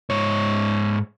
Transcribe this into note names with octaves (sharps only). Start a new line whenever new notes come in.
G#2 C#5